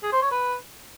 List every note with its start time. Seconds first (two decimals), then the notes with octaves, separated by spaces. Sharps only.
0.03 G#4
0.12 C5
0.22 C#5
0.31 B4